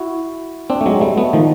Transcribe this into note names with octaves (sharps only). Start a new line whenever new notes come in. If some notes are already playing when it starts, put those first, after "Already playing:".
Already playing: E4 F#4
C4 D4
A3
F#3 G#3
G3 A3
A3 B3
D#3 F3